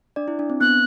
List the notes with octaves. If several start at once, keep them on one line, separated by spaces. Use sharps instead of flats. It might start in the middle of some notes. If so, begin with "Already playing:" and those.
D4 D5
E4
D4
C4
B3 F#6